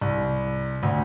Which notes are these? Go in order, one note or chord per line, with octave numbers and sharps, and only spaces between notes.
C2
D2